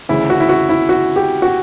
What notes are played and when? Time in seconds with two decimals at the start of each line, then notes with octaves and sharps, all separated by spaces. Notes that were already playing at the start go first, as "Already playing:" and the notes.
0.09 D2 C#3 E3 E4
0.30 F#4
0.40 E4
0.49 F#4
0.69 E4
0.89 F#4
1.16 G4
1.42 F#4